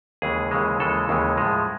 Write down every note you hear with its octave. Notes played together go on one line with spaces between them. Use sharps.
D#2 C#3 E3 G#3 G#4
D#2 C#3 E3 G#3
D#2 C#3 E3 G#3 A4
D#2 C#3 E3 G#3
A2 F3 G#3